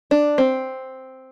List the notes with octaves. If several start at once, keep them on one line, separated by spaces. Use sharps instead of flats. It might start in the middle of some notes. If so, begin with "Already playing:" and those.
D4
C4